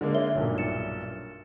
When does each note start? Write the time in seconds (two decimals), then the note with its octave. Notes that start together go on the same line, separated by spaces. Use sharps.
0.01 D3 G#3 A#3
0.14 C#5 E5 G7
0.35 B1 G2 A#2
0.58 A6 C#7 E7